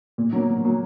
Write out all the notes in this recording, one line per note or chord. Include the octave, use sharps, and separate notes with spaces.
A#2
F#3 A#3
A#2
F#3 A#3